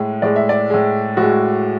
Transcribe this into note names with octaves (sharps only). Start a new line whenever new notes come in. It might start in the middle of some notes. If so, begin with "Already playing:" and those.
Already playing: A2 G#3
A2 G#3 D5
E5
D5
A2 G#3
A2 G#3 F#4